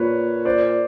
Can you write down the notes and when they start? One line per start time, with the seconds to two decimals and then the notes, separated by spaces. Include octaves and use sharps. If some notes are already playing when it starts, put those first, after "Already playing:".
Already playing: A#2 B4 C#5
0.45 C5 D5